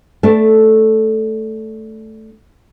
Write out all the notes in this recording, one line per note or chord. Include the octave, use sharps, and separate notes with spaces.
A3 D4